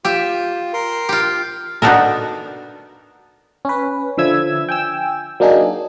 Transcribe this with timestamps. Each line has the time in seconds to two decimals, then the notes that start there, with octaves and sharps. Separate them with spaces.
0.05 F4 G4 E5
0.74 A#4 C6
1.09 F4 G4
1.82 B3 D4 D#4 F#4 A4 A#4
3.65 C#4 B4
4.17 D3 F3 E5 E6 G#6
4.69 G5 G#5 E6
5.40 F#3 A#3 D4 D#4 G#4